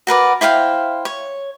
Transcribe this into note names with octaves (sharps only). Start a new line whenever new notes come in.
F#4 A#4 B4 D5
E4 C5 F5 G5
C#5